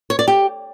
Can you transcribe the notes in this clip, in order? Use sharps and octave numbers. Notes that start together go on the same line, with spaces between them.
C#5
D5
G4